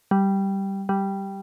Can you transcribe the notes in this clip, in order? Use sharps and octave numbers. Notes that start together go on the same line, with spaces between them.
G3
G3